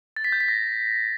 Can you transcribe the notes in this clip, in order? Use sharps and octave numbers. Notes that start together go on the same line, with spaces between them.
A6
B6
G6
B6
A#6